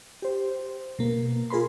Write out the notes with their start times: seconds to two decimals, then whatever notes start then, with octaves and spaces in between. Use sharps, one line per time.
0.22 G4 C5
0.99 B2 A#3
1.50 F4 G#4 A#4 B5 C6